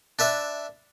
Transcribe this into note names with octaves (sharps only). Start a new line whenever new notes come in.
D4 B4 E5